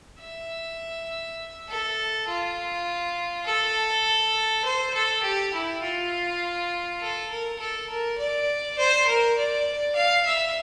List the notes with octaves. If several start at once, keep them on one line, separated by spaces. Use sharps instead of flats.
E5
A4
F4
A4
C5
A4
G4
E4
F4
A4
A#4
A4
A#4
D5
C5
A#4
D5
F5
E5